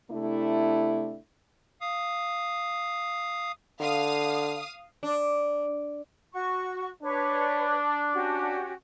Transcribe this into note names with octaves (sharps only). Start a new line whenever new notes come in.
C3 A3 D4 E4
F5 D#6
D3 F5 D#6
D4
F#4 C#6
D4 B4 C#5
C#4 F#4 G4